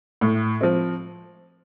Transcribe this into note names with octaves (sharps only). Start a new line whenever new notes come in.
A2
F3 C4